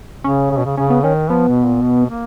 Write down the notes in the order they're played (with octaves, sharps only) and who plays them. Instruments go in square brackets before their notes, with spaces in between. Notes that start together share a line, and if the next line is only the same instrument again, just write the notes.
[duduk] C#3 [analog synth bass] C#4
[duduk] C#3
B2
C#3
[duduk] C#3 [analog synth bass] C#4
[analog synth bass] B3
[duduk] D#3 [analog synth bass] C#4
[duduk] F3 [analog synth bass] B3
[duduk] B2
A#2
B2
A#3